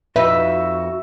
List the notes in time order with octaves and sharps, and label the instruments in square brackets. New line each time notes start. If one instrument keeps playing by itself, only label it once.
[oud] F2 D#4 B4 [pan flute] F#4 [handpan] E5